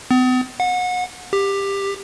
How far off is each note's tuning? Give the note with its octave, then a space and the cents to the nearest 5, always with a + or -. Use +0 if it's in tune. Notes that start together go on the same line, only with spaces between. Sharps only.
B3 +45
F#5 -30
G4 +15